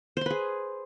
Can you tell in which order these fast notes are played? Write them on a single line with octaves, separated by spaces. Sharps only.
C5 C6 B4 G#4